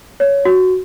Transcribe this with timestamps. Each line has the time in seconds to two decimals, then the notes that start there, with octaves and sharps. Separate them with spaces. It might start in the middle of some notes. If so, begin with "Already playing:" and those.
0.20 C#5
0.45 F#4